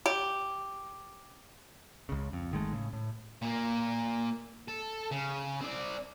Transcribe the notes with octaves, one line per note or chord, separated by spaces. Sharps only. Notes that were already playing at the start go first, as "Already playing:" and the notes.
G4
C#2 C#3
F2
G#1 D#3 G#3 A3
A2 C#3
A2
A#2 A#3
A4
C#3
C4 D5